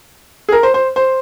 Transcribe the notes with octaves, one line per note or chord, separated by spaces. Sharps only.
G#4
A#4
C5
C5
C5